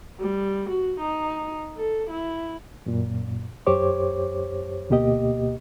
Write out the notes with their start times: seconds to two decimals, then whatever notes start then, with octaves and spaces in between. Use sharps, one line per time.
0.20 G3
0.69 F#4
1.00 D#4
1.76 A4
2.10 E4
2.86 F#2 A#2
3.67 F#2 G4 C5 C#5 D6
4.90 D2 B2 A#3 G4 D#5